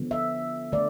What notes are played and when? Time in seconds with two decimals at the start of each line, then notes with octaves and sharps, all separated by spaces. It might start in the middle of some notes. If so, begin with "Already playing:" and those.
Already playing: D3 F3 B3
0.11 E5
0.72 D3 A3 D5